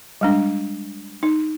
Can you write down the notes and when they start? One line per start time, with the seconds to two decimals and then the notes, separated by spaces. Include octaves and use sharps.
0.21 G3 G#3 D4
1.23 D#4